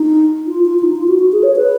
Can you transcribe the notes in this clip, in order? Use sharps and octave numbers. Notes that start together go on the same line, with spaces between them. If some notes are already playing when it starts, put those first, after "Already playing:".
Already playing: D#4
F4
F4
F4
D#4
F4
F#4
F#4
G#4
C#5
B4